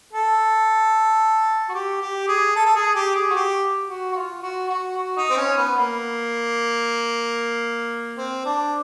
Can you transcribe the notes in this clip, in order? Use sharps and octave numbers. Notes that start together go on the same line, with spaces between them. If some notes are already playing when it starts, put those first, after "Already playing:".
A4
F#4
G4
G4
G#4
A4
A4
G#4
G4
G#4
F#4
G4
F#4
F#4
F4
F#4
F#4
F#4
D#4
C4
C#4
B3
A#3
C4
D4